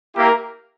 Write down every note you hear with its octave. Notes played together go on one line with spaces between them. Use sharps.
A#3 E4 G4 A#4 F5